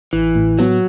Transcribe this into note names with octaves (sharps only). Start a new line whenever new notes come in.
A1 E3
A2
F#3 B3